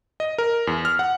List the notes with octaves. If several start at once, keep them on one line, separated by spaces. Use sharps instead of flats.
D#5
A#4
E2
F6
F#5